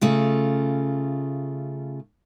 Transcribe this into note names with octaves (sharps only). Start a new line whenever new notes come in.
C#3 A3 F4